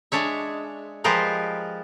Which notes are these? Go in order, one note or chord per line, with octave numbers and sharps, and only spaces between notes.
G#3 D4 C#5 E5
F3 G#3 F4 G4 A#4 B4